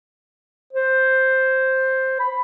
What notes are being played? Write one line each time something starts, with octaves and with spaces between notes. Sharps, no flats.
C5
B5